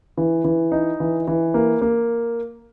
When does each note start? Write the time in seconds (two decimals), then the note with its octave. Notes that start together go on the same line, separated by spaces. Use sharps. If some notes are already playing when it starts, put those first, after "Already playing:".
0.17 E3
0.44 E3
0.72 D#4
1.00 E3
1.27 E3
1.54 A#3
1.81 A#3